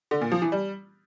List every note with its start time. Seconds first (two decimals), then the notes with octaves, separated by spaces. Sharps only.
0.11 D3
0.21 A#2
0.32 F3
0.42 E3
0.52 G3